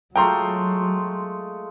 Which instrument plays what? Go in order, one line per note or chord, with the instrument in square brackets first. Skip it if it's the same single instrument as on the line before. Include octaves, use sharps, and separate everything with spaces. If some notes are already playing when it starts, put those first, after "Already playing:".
[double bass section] F#3 [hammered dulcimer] G#3 A3 F4 [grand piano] G5 A#5 C6